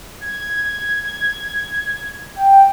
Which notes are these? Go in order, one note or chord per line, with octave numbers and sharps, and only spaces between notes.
G#6
G5